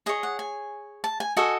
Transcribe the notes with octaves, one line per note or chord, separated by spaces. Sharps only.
G#4 C#5 D#5
F#5
G#5
A5
G#5
F#4 A4 D#5 G#5